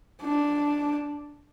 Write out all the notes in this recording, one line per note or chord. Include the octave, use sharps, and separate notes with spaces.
D4